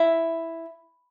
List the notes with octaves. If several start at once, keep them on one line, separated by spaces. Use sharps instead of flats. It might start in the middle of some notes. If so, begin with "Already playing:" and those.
Already playing: E4